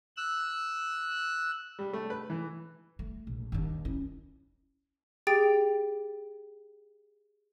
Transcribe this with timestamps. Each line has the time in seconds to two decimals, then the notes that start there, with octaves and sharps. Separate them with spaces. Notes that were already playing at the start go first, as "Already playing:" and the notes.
0.17 E6 F#6
1.79 G3
1.93 A3
2.10 B4
2.30 E3
2.99 A3
3.27 A#1
3.52 D#2 D4
3.85 C#4 E4
5.27 G4 G#4 G5 A6 D7